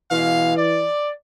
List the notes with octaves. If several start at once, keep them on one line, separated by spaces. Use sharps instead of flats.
B2 E3 G#3 F5
D5